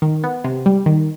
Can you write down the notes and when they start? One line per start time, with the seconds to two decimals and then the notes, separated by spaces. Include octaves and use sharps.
0.02 D#3
0.24 B3
0.44 C3
0.66 G3
0.86 D#3